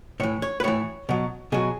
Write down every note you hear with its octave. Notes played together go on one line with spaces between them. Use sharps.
A2 E3 C#5
C#5
B4
A2 E3 C#5
B2 F#3
B2 F#3 G#4